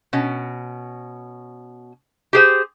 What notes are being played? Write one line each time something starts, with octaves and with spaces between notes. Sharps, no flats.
B2 C#4
G4 G#4 C5